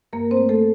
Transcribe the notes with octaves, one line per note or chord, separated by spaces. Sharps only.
G2 A#3 A#4
C4 C5
A3
A3 A4